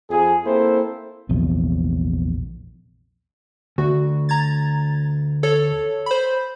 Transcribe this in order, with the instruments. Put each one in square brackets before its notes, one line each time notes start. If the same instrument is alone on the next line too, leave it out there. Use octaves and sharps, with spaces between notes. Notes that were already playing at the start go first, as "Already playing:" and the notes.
[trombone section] F2 F3 G#4
A#3 C4 E4 A4 C5
[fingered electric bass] A#1 E2 C3
[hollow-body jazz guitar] D2 [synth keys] F#4
[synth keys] A#5 G#6 A6
A4 C#5
C5 B5